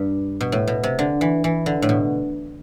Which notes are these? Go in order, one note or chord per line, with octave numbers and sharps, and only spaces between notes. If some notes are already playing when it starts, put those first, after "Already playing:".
Already playing: G2
B2
A2
B2
C3
D3
E3
E3
D3
A2
B2